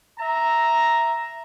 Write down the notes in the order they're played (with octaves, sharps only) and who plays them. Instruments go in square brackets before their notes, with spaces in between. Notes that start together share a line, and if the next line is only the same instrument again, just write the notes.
[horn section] E5 A#5